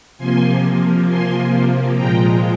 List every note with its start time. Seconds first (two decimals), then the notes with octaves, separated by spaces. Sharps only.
0.18 C3 F3 A#3 G#5 C6
1.07 G#5 C6
1.96 A#2 F3 G#3 G5 A#5